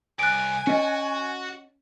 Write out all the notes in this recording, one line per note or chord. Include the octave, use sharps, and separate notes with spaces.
C2 G#5 F#6 D7
C#4 F#4 D#5 A5